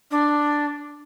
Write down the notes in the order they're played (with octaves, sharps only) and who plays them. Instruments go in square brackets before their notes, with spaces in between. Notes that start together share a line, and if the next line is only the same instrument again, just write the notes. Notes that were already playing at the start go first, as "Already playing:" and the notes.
[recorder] D4